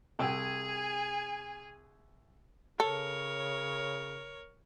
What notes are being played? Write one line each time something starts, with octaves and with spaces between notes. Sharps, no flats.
C2 G#4 G5 G#5 E6
C#3 A4 A#4 C#5